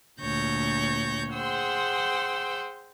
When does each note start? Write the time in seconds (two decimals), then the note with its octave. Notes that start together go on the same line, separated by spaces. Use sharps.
0.21 D2 A#2 C#5 G6 A#6
1.32 G#4 C5 F#5 G5 C6 E6